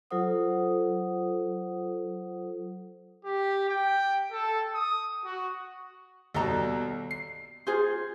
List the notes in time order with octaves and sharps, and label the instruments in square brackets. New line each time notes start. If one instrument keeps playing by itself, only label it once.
[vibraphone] F#3 F4 A4 C5 F#5 D#6
[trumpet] G4
G5
A4
D#6
F#4
[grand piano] D#2 B2 G3 [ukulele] A4 D#5 A#5
[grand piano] C7
[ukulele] F4 G#4 C5